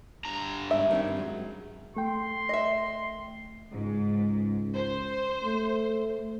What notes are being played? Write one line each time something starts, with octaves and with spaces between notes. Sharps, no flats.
G2 A#5
G#2 C#3 D4 E5
D#3 C4 C#4
F#3 G#3
A3 G5 C6
D#5 E5
C#2 G#2
C5
A3